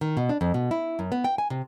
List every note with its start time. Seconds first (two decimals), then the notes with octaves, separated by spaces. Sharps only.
0.01 D#3
0.17 B2
0.29 D4
0.41 F2
0.54 B2
0.71 E4
0.99 F#2
1.12 B3
1.24 G5
1.38 G#5
1.50 C3